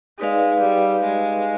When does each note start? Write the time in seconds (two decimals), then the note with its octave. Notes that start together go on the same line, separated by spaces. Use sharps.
0.19 G#3 D#4 G#4 B4 D5 F5
0.60 G3
1.02 G#3